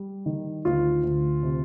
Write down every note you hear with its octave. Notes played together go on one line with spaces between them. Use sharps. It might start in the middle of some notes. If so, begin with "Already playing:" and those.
Already playing: G3
D#3
D2 F4
D2
C3